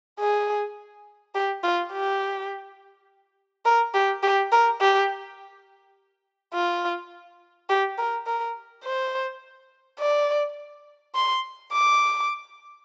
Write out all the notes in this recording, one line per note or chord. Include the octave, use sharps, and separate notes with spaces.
G#4
G4
F4
G4
A#4
G4
G4
A#4
G4
F4
G4
A#4
A#4
C5
D5
C6
D6